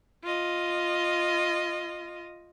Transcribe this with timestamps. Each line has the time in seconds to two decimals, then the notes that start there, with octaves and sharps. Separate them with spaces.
0.24 F4 D#5